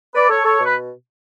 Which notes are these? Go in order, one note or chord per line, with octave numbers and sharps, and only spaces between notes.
B4 D5
A4 C#5
A4 C#5
B2
B4